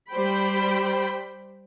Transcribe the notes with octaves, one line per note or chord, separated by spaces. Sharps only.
G3 C5 G5 B5